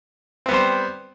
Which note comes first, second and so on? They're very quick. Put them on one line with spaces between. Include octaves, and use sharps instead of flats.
C4 B3 G3 C5